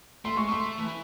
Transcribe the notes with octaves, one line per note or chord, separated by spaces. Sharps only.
A3 C6
G#3 C#6
A3 C6
E3